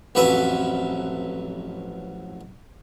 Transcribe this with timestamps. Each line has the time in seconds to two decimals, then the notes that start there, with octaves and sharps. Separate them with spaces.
0.15 A1 F2 F#3 B4 E5